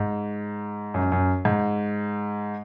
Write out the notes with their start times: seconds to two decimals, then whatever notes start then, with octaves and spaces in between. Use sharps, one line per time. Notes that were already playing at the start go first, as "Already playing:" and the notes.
Already playing: G#2
0.94 F#2
1.12 F#2
1.45 G#2